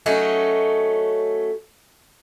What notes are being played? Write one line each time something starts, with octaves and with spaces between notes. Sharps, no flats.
F#3 A3 C#4 D#4